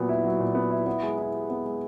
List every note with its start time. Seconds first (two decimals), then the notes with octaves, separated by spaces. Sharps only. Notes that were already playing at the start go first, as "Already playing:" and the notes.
Already playing: A#2 F#3 B3
0.09 E4
0.24 F#3
0.39 A#2
0.55 B3
0.71 E4
0.86 B3
1.03 G#3
1.18 E4
1.34 G4
1.50 B3
1.65 G#3